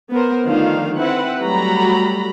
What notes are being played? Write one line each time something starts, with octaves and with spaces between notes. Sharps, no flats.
B3 A#4 C5
D3 D#3 F3 A3 D4 F5
C4 E4 B4 F#5
F#3 G3 A3 F#4 A#5 B5